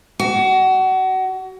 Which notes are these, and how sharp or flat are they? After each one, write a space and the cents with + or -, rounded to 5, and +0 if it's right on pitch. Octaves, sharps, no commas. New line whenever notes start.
F#4 +25